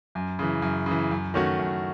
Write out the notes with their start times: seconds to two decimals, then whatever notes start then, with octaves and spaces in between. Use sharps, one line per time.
0.15 F#2
0.39 C#3 E3
0.62 F#2
0.86 C#3 E3
1.11 F#2
1.34 D#3 A3 C#4 F#4
1.59 F#2